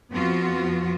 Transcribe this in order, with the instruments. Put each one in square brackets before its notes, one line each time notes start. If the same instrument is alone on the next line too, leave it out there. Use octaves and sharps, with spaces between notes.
[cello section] F2 F3 B3 F4 F#4